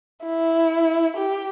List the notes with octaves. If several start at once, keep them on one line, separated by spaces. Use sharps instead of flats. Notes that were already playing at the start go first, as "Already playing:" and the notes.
E4
G4